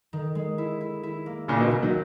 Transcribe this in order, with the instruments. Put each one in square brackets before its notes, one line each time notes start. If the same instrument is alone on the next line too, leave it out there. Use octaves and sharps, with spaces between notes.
[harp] D#3
G#3
E4
E4
E4
A#3
[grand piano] A#2 C#3 [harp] E4
[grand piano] B2 D#3
[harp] A#3
[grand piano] D#3 F#3